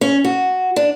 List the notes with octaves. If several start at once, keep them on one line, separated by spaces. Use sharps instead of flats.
C#4
F#4
D4